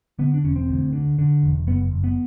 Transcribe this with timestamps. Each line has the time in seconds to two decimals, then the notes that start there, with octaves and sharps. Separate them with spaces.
0.19 D3 B3
0.34 D4
0.44 E1 C#4
0.56 C4
0.69 D2
0.93 D3
1.19 D3
1.43 E1
1.67 F#1 B3
1.91 F#1
2.04 B3